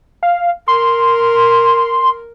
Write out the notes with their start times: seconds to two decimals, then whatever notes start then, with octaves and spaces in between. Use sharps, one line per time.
0.23 F5
0.68 A#4 C6